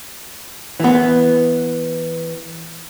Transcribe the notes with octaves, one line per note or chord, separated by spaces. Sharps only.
E3 B3